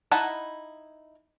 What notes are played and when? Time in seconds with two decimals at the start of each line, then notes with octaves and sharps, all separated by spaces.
0.12 D#4 E4 F#5 A5 B5